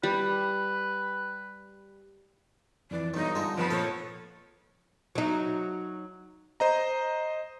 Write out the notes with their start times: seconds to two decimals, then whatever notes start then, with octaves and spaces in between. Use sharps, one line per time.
0.03 G3 B4
2.91 F2 E3 D5
3.14 B1 G2 D#4
3.35 G2 D3 G#3 F4 A5
3.57 F3 B3 C4 B4
3.71 A#2 A4 C#5 D#5
5.15 F#3 D#4
6.60 C5 D#5 A#5